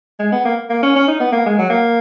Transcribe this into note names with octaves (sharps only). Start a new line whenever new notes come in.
G#3
B3
A#3
A#3
C#4
C#4
D#4
B3
A#3
G#3
F#3
A#3